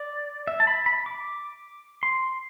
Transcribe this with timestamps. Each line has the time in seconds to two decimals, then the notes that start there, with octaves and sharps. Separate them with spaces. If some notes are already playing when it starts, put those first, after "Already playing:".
Already playing: D5
0.47 E5
0.60 A5
0.67 B5
0.86 B5
1.06 D6
2.03 C6